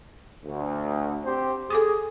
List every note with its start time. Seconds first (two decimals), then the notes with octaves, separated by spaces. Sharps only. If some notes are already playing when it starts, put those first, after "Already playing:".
0.45 D2
1.25 C4 G4 C5
1.70 G#4 A4 D6 D#6